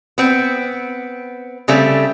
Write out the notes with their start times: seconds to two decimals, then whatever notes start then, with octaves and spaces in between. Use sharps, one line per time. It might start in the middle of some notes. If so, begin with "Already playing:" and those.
0.18 B3 C4
1.68 C#3 G3 A3 C4